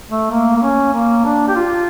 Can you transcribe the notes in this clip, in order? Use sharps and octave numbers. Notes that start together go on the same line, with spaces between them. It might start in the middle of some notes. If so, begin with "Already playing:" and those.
A3
A#3
A#3
C#4
A#3
D4
G4
F4